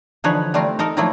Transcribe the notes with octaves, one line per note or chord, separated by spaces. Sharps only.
D3 E3 F3 D#4 B4 C#5
G3 A3 C4 F4 A#4
D#4 A4 A#4
D#3 F3 F#3 A3 A#3 E4